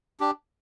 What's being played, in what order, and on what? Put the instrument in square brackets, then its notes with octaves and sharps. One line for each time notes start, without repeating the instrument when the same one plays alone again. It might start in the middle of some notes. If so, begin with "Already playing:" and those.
[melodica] D4 G4